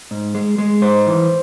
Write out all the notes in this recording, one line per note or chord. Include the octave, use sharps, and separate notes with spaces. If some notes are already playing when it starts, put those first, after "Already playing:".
G#2
G#3
G#3
G#2 C5
E3